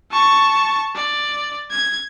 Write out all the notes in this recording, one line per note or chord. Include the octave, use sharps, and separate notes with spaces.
A5 C#6
D5
G#6